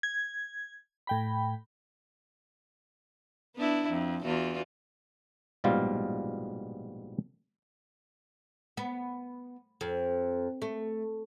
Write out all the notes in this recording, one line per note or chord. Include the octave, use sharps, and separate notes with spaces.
G#6
A2 G5 B5
B3 D4 E4
F2
E2 F4 F#4
A#1 G#2 B2 G3 F4 F5
B3
F2
A3